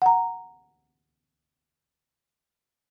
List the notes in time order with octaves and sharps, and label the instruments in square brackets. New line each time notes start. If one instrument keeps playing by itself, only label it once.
[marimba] F#5 A#5